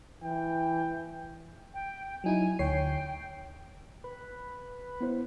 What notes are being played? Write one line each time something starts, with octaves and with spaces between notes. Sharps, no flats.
E3 G5
G5
F#3 D#4 E4 G#5
D2 C#5 G5 C7
B4
B3 E4 C5